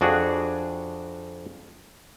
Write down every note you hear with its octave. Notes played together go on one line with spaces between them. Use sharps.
F2 D4 F#4 G#4 F#5